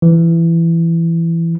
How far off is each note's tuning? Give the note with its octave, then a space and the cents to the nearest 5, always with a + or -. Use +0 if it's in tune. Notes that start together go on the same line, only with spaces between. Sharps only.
E3 +15